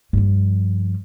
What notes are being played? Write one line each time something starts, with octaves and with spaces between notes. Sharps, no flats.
G2 F3